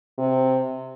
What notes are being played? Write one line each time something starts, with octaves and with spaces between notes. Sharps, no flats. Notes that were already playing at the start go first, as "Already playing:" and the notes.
C3